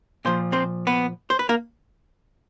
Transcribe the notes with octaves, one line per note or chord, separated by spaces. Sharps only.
A#2 F3 C5
C4 C5
B3 B4
C5
B4
A#3 A#4